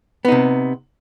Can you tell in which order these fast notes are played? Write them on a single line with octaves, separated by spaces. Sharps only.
B3 D#4 C3